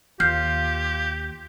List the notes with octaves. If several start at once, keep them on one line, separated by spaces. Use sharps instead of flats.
D#2 F4 G4 F6 G6 C7